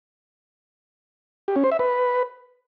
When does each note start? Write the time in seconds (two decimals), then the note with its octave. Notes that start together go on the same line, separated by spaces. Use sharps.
1.48 G4
1.56 C#4
1.64 C5
1.72 E5
1.79 B4